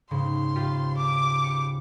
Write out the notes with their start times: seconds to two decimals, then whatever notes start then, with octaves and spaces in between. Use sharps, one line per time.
0.11 D#2 G#2 C#3 C6
0.55 G#1 F4 G4
0.97 D6
1.44 C#7